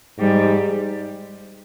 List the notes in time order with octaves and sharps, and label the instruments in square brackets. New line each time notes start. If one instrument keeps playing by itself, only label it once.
[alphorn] G#2 [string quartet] G3